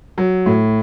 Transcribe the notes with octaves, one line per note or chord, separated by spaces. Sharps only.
F#3
A2